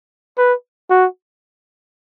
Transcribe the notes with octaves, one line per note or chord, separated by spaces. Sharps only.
B4
F#4